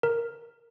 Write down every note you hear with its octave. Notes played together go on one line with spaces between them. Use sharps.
A#4